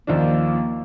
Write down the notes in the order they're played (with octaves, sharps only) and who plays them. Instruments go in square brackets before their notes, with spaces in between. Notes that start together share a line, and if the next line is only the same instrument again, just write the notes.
[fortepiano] D#2 F3 D4 [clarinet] A#3